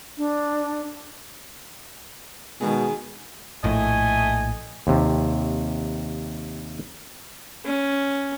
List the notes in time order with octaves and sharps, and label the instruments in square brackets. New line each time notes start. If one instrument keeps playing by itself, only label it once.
[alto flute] D4
[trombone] B2 [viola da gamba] D#3 [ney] G#3 [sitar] G#4
[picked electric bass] A#1 A2 [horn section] A3 D#5 G#5
[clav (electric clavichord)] D#2 C3
[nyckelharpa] C#4